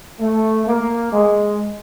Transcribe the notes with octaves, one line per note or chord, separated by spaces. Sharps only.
A3
A#3
G#3